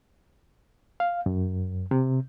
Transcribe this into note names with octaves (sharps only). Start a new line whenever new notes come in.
F5
F#2
C3